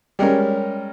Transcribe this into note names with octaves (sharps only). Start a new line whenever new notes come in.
G3 G#3 C#4 A#4